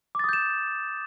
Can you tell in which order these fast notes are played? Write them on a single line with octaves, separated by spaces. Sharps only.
D6 A6 D#6 G6 E7